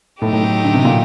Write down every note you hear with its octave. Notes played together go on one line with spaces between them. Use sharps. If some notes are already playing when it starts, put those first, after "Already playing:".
A2 F#3 A3 D#4 G4
A2
A2
D3
C3
A#2